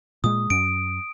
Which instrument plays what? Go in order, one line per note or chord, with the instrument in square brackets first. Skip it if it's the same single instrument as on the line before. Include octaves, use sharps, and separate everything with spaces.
[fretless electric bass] A#2 G#3 [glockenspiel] D#6
[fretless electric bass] F#2 [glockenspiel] D7